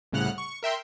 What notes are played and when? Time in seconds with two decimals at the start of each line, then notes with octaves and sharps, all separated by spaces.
0.12 C2 A2 C#3 F#5 F6 F#6
0.38 C#6
0.63 A#4 E5 G5 C6